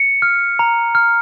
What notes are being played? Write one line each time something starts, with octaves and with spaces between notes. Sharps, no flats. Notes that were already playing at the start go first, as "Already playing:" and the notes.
Already playing: C#7
F6
A#5
F6